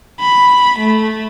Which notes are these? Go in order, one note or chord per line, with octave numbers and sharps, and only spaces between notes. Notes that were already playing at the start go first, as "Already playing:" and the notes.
B5
A3